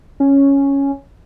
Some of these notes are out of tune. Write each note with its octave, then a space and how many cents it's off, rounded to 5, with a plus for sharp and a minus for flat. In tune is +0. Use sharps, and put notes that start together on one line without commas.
C#4 +0